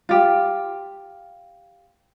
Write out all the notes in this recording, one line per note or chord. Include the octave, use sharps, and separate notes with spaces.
F4 G4